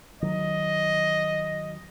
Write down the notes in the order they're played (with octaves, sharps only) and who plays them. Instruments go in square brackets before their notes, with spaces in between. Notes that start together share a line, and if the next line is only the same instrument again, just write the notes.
[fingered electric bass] D#3 F#3 [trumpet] D#5